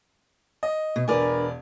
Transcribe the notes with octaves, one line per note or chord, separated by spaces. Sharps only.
D#5
B2
E1 D4 A#4 B4 D5 G#5